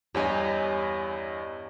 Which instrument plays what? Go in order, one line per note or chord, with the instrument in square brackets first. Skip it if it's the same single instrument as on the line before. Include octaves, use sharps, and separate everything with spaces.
[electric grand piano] E2 G2 D#5 [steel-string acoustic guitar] G4 C#5 G#5